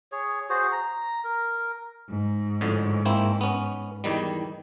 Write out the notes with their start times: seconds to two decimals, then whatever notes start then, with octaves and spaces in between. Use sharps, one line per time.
0.12 G#4 C#5
0.50 F#4 G#4 C5
0.72 A#5
1.24 A#4
2.10 G#2
2.61 F2 A2 D3
3.05 A#3 C4 E4
3.41 B3 C#4
4.04 E2 D#3 G3